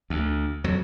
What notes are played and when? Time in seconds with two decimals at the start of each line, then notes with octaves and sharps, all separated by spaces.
0.10 D2
0.64 F2 F#3